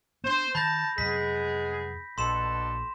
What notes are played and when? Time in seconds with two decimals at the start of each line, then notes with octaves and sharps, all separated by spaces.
0.24 B3 C#4 D4 C5
0.55 D#3 A5 B5 G6 A#6
0.98 F2 C3 F#3 G#3 B3 G#4 B6
2.18 A#1 B2 D4 A4 C6 E7